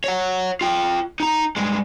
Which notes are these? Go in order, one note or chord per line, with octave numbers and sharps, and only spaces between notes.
C#5 F#5
F4 G5
D#4 A#5
G2 G#3